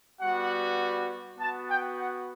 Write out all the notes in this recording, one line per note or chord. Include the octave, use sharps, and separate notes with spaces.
G3 B3 F#4 F#5
B3 F#4 A5
G5
F#5